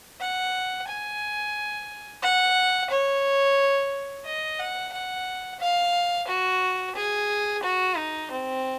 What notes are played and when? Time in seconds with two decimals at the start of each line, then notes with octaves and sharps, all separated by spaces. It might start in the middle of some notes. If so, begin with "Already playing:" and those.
0.20 F#5
0.87 G#5
2.22 F#5
2.90 C#5
4.25 D#5
4.59 F#5
4.93 F#5
5.60 F5
6.28 F#4
6.95 G#4
7.63 F#4
7.97 D#4
8.31 C4